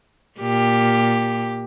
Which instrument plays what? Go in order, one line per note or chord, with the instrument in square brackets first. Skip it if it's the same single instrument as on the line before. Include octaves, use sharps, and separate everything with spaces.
[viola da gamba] A#2 G4